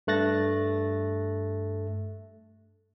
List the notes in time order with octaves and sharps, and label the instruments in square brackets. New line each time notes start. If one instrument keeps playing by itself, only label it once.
[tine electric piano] G2 A3 F#6 A6 A#6